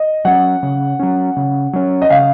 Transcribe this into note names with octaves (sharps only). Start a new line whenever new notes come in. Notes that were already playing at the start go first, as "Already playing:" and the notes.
Already playing: D#5
F#3 C#4 F#5
C#3
F#3 C#4
C#3
F#3 C#4
D#5
C#3 F5